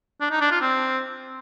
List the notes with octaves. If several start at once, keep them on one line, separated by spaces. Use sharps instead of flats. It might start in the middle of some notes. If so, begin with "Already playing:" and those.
D4
D#4
D4
F4
C4